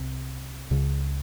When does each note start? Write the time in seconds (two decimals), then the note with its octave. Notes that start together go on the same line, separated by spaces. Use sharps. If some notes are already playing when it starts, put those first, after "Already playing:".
Already playing: C2 C3
0.71 C#2 C#3